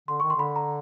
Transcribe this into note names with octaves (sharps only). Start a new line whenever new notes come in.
D3 C6
D#3 C#6
C6
D3 B5
A#5